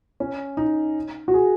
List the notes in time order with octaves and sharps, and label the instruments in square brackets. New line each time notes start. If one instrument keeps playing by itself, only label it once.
[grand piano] C#4
D#4
F#4
G#4